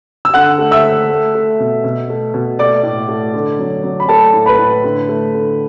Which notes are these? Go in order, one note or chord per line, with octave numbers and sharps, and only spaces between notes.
E6
D3 F#5 F#6
A3
E5 E6
A3
A3
A3
B2
B2
A3
B2
A3 D5 D6
A2
A3
D3
F#3
F#3
B5
A3 A4 A5
A2
B4 B5
A2
D3
A3
D3